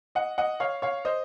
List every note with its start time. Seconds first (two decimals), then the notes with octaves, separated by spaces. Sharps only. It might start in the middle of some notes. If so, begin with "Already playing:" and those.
0.15 D#5 F#5
0.38 D#5 F#5
0.60 C#5 F5
0.82 C#5 F5
1.05 C5 D#5